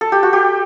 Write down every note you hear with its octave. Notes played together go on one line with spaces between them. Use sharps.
A4
G4
F#4
G4